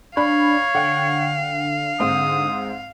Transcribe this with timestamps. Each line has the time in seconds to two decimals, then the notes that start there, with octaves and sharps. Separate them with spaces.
0.17 D4 C#5 F5 B5
0.75 D3 F#5 G5
2.00 G#2 C4 D#6